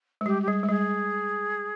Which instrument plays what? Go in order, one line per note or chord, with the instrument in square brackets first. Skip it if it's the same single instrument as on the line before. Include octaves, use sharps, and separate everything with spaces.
[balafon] G#3
[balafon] G3 [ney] G4
[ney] G4
[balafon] G3 [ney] G#4
[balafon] G#3
[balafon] G3 [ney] G#4